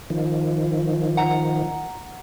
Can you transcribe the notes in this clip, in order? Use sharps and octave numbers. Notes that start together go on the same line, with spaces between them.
D#3 F3
F#5 A#5